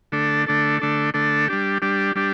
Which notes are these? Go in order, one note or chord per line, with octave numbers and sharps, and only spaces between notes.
D3 A3 D4 A4
D3 A3 D4 A4
D3 A3 D4 A4
D3 A3 D4 A4
G3 D4 G4
G3 D4 G4
G3 D4 G4